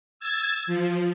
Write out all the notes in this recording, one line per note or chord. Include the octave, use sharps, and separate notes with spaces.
E6 G#6 A6
F3